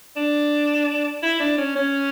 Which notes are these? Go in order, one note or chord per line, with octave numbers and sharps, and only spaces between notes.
D4
E4
D4
C#4
C#4